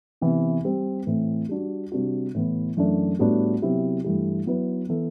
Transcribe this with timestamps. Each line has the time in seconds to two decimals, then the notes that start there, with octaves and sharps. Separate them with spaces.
0.21 C3 E3 B3
0.65 G3 C4 G4
1.07 A2 E3 A3 C4 E4
1.49 G3 D4 F#4
1.92 C3 G3 D4 F#4
2.35 A2 E3 B3
2.77 F#2 E3 A3 D4
3.19 A2 G3 B3 D4 F#4
3.62 C3 F#3 B3 E4 G4
4.04 G2 E3 A3 E4 G4
4.47 F#3 B3 E4 B4
4.89 E3 B3 E4 A4